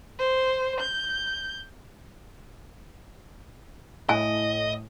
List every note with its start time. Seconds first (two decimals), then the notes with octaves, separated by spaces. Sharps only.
0.19 C5
0.80 G6
4.09 A2 D#5 G#5